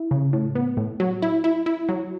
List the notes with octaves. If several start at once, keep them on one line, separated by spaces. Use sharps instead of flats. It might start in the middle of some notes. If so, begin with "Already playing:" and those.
Already playing: E4
C#3
A2
B3
A2
F#3
E4
E4
E4
F#3